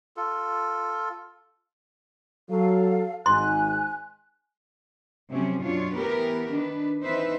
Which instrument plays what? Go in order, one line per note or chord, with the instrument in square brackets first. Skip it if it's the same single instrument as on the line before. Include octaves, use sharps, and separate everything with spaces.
[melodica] F4 A4
[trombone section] F#3 [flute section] A4 F5
[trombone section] G#1 G#2 [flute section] G#5 F#6 [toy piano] C6
[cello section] C3 F3 F#3 A3 C4 C#4
F#2 B2 F#3 D4 F4 C#5
E3 A3 B3 G4 A#4 B4
D#3 D4 B4
E3 C4 D#4 B4 C5 E5